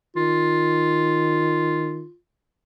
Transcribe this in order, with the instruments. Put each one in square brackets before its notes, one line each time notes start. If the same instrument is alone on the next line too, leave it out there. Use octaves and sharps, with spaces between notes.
[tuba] D#3 [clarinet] F4